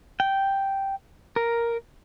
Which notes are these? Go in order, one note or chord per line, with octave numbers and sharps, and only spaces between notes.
G5
A#4